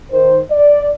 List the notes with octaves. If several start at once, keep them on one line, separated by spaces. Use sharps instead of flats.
D#3 C5
D5